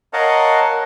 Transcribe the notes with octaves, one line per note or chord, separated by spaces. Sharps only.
A#4 C#5 D#5 F5 F#5 A5